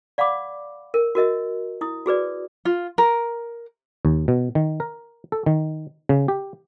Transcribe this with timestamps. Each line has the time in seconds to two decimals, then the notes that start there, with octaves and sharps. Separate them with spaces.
0.18 D5 F5 F#5 B5 D6
0.94 A#4
1.15 F#4 A#4 D#5 E5
1.81 E4 D#6
2.06 F#4 G#4 B4 D5
2.65 F4
2.98 A#4
4.05 D#2
4.28 B2
4.55 D#3
4.80 A#4
5.32 A4
5.46 D#3
6.09 C#3
6.28 G4